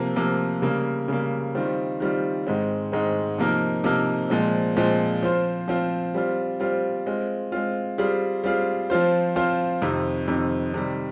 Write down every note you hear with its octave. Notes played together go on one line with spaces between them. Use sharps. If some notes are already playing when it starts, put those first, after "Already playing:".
Already playing: C3 F3 A#3
C3 F3 A#3
C#3 G3 A#3
C#3 G3 A#3
D#3 G3 C4 F4
D#3 G3 C4 F4
G#2 D#3 G#3 C4
G#2 D#3 G#3 C4
C3 F3 A#3 D#4 A#4
C3 F3 A#3 D#4 A#4
A#2 F3 G#3 C4
A#2 F3 G#3 C4
F3 C4 F4 C5
F3 C4 F4 C5
G3 C4 F4
G3 C4 F4
G#3 C4 F4
G#3 C4 F4
G3 C4 F4 G#4
G3 C4 F4 G#4
F3 C4 F4 C5
F3 C4 F4 C5
F2 C3 D#3
F2 C3 D#3
C3 D#3 G3